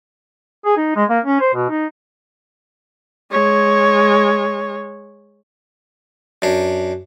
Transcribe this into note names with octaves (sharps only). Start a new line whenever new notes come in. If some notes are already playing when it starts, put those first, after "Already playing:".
G#4
D#4
G#3
A#3
C#4
C5
B2
D#4
G#3 C#5
F#2 D4